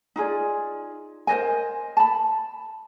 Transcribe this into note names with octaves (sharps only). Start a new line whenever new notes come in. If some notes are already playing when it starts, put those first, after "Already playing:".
D#4 F4 G#4 D5
A#4 C5 D#5 G#5
A5 B5